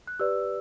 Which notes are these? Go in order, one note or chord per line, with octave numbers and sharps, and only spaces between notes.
F#6
G4 B4 D5 E6